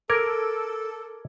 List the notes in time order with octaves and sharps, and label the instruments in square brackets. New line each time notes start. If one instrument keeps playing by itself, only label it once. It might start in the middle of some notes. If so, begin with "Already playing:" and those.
[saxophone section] A4 [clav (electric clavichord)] A#4 [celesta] D6 G#6 D7